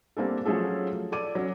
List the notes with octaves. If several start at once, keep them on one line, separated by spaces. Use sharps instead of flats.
G3 A#3 C4 D4 A4
F3 F#3 A3 C#4 G#4 A4
A4 D5 D6 D#7
F#3 C#4